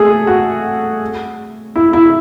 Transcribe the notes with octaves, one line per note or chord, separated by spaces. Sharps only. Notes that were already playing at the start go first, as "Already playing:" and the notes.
Already playing: A3 G#4
F#4
E4
E4